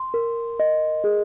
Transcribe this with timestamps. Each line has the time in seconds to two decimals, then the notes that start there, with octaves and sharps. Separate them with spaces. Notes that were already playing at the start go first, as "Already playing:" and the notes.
Already playing: C6
0.14 A#4
0.60 D#5
1.04 G#4